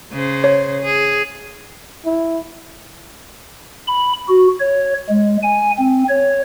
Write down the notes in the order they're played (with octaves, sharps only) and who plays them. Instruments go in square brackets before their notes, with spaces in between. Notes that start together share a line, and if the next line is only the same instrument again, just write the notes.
[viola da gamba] C#3 C5
[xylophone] C#5
[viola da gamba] G#4
[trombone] E4
[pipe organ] B5
F#4
C#5
G#3
G#5
C4
C#5